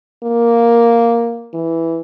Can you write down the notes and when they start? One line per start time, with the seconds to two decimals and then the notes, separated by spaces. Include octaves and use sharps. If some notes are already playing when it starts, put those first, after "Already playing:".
0.23 A#3
1.54 E3